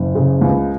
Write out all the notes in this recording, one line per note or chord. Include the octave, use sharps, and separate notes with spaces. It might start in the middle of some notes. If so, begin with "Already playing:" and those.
Already playing: F#1
C#3
C#2